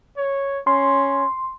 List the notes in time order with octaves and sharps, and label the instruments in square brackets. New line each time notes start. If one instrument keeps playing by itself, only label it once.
[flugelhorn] C#5
[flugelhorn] C#4 [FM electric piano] C6